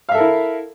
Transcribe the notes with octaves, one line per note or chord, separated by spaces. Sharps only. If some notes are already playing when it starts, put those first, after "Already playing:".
E4 A4 A#4 E5 F5